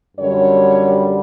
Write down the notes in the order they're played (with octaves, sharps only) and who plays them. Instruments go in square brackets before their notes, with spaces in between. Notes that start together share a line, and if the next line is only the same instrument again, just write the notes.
[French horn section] F#2 D3 G3 C#5